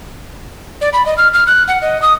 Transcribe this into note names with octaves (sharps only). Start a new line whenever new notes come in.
D5
B5
D#5
F6
F6
F#6
F#5
D#5
D#6